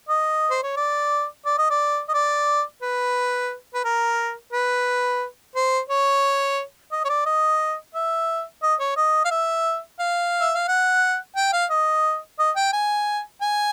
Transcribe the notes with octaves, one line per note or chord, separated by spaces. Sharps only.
D#5
C5
C#5
D5
D5
D#5
D5
D#5
D5
B4
B4
A#4
B4
C5
C#5
D#5
C#5
D5
D#5
E5
D#5
C#5
D#5
F5
E5
F5
E5
F5
F#5
G5
F5
D#5
D#5
G5
G#5
G#5